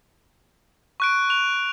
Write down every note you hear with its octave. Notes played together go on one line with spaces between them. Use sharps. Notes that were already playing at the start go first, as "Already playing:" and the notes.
C#6 F#6 D7
F#6 F7